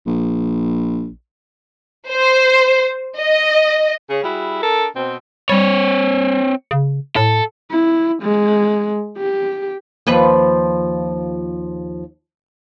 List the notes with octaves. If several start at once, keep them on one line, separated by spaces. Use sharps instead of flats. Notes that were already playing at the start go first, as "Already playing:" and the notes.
A#1
C5
D#5
C#3 G#4
G3 E4 F#4 G#4
D4 A4 A#4
B2 C4
G3 C4 C#5
C#3
A2 A4
E4
G#3
G4
D#2 F3 B4